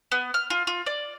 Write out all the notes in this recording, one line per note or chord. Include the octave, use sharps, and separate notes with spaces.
B3
F6
F4
F4
D5